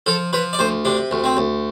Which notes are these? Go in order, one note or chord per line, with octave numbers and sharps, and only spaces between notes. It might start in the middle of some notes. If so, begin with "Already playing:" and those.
F3 A4
F3 B4
D5
D2 C5
C3 D4
D2
C4
D2